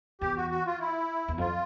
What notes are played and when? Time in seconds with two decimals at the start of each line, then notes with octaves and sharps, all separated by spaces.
0.21 E2 G4
0.36 F#4
0.50 F#4
0.66 F4
0.79 E4
1.28 E2
1.38 F2 F4